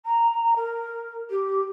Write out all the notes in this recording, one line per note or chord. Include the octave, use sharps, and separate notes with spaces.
A#5
A#4
G4